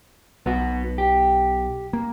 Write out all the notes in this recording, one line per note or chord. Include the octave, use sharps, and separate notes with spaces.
B1 B3 F#4
G4
A#3